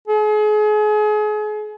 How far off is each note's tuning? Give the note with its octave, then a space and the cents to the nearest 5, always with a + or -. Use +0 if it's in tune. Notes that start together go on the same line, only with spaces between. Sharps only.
G#4 +35